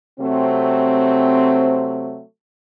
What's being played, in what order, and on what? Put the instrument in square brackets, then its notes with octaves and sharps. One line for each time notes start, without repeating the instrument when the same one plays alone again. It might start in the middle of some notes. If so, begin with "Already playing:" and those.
[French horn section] C3 F#3 A3 C4